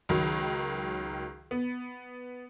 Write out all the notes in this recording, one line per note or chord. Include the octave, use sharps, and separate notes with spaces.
C#2 D#3 F#3
B3